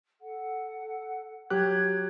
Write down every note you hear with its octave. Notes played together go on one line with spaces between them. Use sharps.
A4 F#5
F#3 G4 F#6 G#6